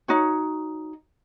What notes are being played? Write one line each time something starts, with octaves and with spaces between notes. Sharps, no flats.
D#4 F#4 C#5